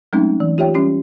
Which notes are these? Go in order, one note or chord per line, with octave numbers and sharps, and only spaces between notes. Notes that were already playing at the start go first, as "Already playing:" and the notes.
F#3 G#3 A3 C4 C#4 D#4
E3
F4 G4 C#5 E5 G5
G3 C#4 E4 G4